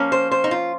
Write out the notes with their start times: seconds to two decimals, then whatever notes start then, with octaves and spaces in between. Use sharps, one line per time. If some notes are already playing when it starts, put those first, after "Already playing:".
Already playing: F3 A#3 C#4
0.12 C5
0.31 C5
0.44 D#4
0.51 F4